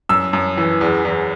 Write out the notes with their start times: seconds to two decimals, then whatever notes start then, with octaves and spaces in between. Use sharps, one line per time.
0.09 F#2 E6
0.33 F#2
0.57 E3
0.81 E2
1.05 E2